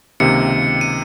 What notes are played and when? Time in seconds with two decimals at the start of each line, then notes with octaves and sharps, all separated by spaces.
0.20 C#2 C3 D#3 A#3 C#7
0.81 D#7